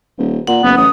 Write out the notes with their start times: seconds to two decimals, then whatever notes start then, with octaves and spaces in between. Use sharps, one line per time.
0.18 D#1
0.47 A#2 F#5
0.64 F#1 B3
0.78 A1 D#6